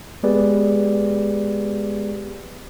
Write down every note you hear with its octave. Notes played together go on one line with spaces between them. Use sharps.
G#3 B3 G4 G#4 B4 D5